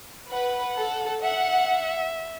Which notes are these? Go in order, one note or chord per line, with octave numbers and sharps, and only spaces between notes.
B4 F#5
A4
E5 F#5